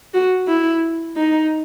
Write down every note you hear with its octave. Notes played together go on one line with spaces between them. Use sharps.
F#4
E4
D#4